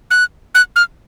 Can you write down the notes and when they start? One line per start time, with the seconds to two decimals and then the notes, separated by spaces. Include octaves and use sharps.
0.11 F#6
0.55 F#6
0.76 F6